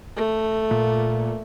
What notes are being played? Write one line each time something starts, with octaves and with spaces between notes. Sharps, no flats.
A3
A#2